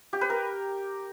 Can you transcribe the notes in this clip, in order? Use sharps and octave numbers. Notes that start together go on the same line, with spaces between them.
G4
B4
A#4